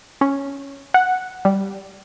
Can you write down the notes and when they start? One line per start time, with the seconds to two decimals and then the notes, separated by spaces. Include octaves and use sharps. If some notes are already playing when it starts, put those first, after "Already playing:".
0.21 C#4
0.94 F#5
1.45 G3